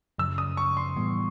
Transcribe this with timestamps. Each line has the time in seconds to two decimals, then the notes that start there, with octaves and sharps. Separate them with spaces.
0.18 F#2 C#3 F3 E6
0.38 D#6
0.57 C#6
0.77 C6
0.96 A2 E3 G3 B3